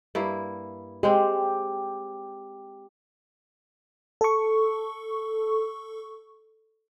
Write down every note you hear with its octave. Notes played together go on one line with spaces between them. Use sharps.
G2 A#3 E4
G#3 C4 G4
A4 C#6